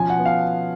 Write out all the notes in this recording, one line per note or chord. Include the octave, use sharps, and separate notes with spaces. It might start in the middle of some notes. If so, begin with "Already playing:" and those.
Already playing: B2 F3 C#4 G#5
F#5
B3
F5